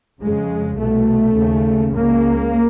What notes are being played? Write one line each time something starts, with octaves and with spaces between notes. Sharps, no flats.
F2 C#3 G#3
C2 B2 A3
D#2 C#3
C#2 C#3 A#3